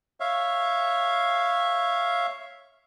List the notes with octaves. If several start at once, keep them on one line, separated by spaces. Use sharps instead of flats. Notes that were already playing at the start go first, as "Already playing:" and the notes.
C#5 E5 F5